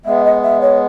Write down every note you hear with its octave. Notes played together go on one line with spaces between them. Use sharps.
G#3 B3 E5
D#5
E5
C#5